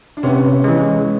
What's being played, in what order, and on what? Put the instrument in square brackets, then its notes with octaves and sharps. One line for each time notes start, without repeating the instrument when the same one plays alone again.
[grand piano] D4
[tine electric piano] C3 [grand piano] B3 C#4
[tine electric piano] E3 G#3